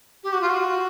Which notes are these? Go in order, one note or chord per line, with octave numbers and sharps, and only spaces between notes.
G4
F#4
F4
F#4